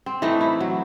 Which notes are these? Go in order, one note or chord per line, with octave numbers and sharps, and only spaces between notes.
C4
E3 A3 D#4 E4
E4
F#3